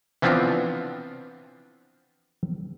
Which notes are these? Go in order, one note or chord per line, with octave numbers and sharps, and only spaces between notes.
E3 F3 B3 C4 D4 F4